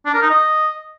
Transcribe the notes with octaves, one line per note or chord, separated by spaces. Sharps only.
D4
A#4
D#4
D#5